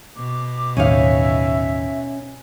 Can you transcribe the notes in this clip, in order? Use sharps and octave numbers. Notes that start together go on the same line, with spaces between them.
B2 D6
A1 D#2 C#4 D#4 E5 F5